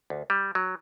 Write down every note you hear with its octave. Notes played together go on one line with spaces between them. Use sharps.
D2
G3
F#3